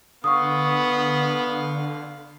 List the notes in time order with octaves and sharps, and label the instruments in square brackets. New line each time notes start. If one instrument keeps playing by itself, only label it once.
[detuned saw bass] D3 [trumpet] B3 [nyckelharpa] F5 [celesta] C#6 D#6